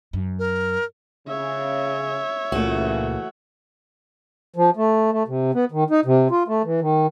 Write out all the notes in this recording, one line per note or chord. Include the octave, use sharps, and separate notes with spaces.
F#2
A#4
C#3 C#5 E5
C#2 A#2 C#3 E3 A3 A#3 F#4
F3
A3
A3
C3
B3
D#3
D#4
C3
F4
A3
E3
D#3